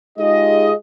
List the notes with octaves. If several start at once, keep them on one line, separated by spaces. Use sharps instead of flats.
G#3 D#4 F4 G4 G#4 D#5